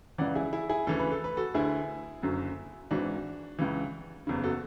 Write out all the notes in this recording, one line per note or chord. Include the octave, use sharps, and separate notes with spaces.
C#2 C#3 E3 D5 F#5
E4 G#4
E4 G#4
E4 G#4
D2 C#3 E3 A4
B4
A4
B4
F#4 A4
D2 D3 E4 G#4
F#1 F#2 D3
G#1 G#2 E3 D4 F#4
C#2 C#3 E3
F#1 E2 C#3
F#4 A4